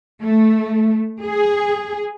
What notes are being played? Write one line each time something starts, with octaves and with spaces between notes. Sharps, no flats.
A3
G#4